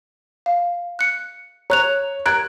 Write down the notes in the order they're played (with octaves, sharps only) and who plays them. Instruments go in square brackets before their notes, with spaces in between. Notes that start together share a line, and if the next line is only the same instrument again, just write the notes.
[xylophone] F5
F#6 C#7
[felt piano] C#5 [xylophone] A#5 F#6 F7
[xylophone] A#5 G#6 D7 [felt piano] F#6